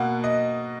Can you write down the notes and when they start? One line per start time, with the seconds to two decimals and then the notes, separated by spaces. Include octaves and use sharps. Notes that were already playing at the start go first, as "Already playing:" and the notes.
Already playing: B2 A#3 F#5
0.24 D#5